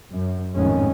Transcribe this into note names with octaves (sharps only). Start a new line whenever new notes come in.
F#2
G#1 F2 A2 D#3 G#3 C#4